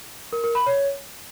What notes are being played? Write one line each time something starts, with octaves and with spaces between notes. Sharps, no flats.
A#4
A#4
B5
C#5